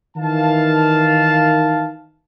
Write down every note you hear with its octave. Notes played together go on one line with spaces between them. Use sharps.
D#3 E3 F5 A5